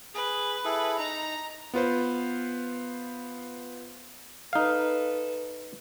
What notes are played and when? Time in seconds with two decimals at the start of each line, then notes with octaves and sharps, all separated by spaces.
0.14 G#4 B4
0.65 E4 G#4 A4
0.99 D#4 A#5
1.74 B3 F4 B4 C5
4.53 D#4 A4 B4 F5